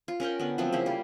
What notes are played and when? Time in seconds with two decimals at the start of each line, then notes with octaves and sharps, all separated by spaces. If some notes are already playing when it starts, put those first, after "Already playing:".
0.08 F4
0.20 C#4 A#4 F#5 G5
0.40 D3 B3
0.58 F3 F#3 A3 C4
0.72 C#3 A#3 E4
0.86 G3 F4